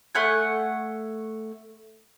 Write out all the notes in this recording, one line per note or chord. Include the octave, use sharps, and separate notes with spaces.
A3 F#5 G#5